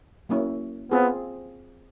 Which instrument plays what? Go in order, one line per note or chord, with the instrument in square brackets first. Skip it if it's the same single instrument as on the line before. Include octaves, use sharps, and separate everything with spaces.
[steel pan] F#3 A#3 C#4 E4
[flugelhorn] B3 [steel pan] C4 F4 G#4